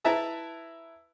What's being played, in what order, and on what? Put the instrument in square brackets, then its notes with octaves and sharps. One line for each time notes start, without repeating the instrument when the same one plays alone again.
[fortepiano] E4 B4 E5 A5 A#5 E6